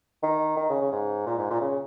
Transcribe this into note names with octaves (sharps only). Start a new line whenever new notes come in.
D#3
D#3
C#3
C#3
G#2
A#2
G#2
A#2
C#3